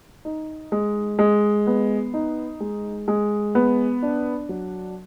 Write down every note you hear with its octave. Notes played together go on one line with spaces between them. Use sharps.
D#4
G#3
G#3
B3
D#4
G#3
G#3
B3
D4
F#3